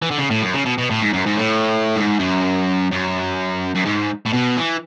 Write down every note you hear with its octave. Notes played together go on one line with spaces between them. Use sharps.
E3
D3
C#3
A2
F#2
C#3
B2
B2
A2
G#2
F#2
G#2
A2
G#2
F#2
F#2
F#2
G#2
A2
B2
E3